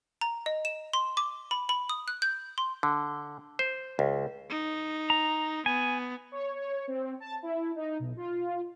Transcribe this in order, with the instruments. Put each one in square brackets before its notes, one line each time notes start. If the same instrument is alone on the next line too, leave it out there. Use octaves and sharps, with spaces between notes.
[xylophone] A#5
D#5
E7
C6
D6
B5
B5
D#6
F#6
G6
C6
[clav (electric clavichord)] D3
C5
C#2
[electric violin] D#4
[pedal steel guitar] A#5
[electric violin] B3 [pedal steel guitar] G#5
[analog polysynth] C#5
C#5
C4
A5
E4
D#4
B1
F4